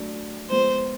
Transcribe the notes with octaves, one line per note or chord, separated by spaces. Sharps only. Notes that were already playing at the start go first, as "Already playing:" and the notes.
Already playing: F#3 A3 D4
F3 G#3 B3 C5